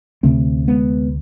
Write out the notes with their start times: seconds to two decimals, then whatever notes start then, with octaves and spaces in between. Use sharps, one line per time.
0.23 D2 C3 A3 C4
0.68 G#3 B3